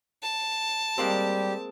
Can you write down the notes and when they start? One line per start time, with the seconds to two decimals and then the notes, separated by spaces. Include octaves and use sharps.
0.23 A5
0.98 G3 G#3 A#3 C4 G4